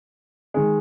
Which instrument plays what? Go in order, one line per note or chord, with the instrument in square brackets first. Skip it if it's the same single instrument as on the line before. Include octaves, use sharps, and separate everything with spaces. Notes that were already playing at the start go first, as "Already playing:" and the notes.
[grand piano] D#3 G#3